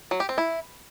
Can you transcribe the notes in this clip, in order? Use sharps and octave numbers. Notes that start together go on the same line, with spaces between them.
F#3
G4
C4
E4